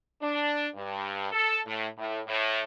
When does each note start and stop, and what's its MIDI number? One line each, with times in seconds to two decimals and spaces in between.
0.21 0.67 62
0.75 1.30 43
1.32 1.58 69
1.66 1.87 45
1.98 2.20 45
2.27 2.60 45